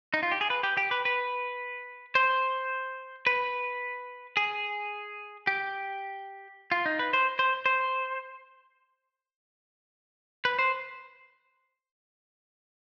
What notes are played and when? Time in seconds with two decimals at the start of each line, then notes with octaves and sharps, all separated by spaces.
0.14 D#4
0.23 F4
0.32 G4
0.41 G#4
0.50 B4
0.63 G4
0.77 G4
0.91 B4
1.05 B4
2.15 C5
3.27 B4
4.37 G#4
5.47 G4
6.72 F4
6.86 D#4
6.99 B4
7.13 C5
7.39 C5
7.66 C5
10.45 B4
10.59 C5